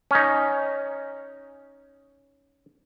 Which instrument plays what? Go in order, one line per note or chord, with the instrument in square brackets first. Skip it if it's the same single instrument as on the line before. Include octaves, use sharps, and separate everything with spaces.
[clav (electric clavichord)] C#4 D#4